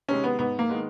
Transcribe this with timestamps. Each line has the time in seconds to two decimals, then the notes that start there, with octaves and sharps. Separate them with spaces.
0.09 C3 D#3 G#3 C#4
0.24 B3
0.39 G#2 B3
0.59 A#3
0.69 D#3 G#3 B3